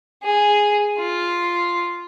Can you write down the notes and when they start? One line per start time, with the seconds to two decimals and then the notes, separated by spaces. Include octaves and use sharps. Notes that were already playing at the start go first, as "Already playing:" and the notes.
0.23 G#4
0.99 F4